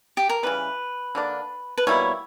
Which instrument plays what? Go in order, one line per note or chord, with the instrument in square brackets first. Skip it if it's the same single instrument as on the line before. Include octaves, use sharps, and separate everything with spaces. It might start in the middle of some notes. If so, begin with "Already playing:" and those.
[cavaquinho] G4
A#4
[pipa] C#3 E3 G3 [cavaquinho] B4
[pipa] D3 A#3 D4
[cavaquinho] B4
[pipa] B2 G3 A#3 E4 [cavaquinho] C#5